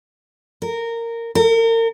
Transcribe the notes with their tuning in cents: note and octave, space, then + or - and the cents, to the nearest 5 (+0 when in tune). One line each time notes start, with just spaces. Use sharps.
A#4 -15
A#4 -35